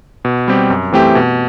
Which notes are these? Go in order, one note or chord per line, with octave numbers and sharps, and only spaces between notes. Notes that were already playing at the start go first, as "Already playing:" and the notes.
B2
G3 C4 G4
F#2
E3 A3 C4 G4
B2